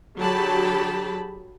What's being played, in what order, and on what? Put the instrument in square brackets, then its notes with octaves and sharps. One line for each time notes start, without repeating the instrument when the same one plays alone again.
[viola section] D3 F#3 G4 G#4 A5 B5